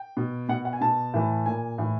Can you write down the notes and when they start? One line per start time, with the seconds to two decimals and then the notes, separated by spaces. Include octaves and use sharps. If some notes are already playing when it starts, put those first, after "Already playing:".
Already playing: G5
0.17 B2
0.49 B2 F#5
0.65 F#5
0.73 G#5
0.81 B2 A5
1.14 A2 E3
1.46 A#2 G#5
1.78 A2 E3